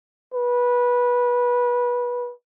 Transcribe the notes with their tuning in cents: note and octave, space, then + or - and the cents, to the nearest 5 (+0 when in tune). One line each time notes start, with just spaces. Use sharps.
B4 -20